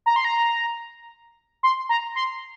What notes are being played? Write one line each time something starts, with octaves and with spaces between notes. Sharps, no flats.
A#5
C6
A#5
C6
A#5
C6